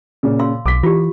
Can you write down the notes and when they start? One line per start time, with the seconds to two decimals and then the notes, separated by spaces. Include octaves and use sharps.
0.23 A#2 C#3
0.39 F5 C6 E6
0.66 B1 D6 B6
0.83 E3 F4 G4